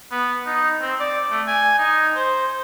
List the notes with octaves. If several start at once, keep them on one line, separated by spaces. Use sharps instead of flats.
B3
D#4
C4
D5
A3
G#5
D#4
C5